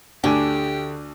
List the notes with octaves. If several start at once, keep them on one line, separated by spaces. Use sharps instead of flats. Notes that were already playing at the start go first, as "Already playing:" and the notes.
D2 D3 D4 G4 G#5